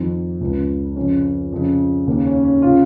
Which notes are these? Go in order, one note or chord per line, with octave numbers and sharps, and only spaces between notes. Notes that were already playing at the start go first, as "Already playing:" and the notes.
Already playing: F2 D#3
C#2 C#3
F2 C#3 C#4
F2 C#3
D#2 C#3 A#3
C#4
C#4
C#3 F4